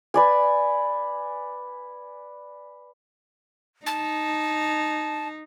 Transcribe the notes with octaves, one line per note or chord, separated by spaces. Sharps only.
B4 D5 G#5
D#4 A5